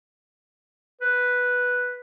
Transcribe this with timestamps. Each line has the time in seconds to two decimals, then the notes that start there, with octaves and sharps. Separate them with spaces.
1.02 B4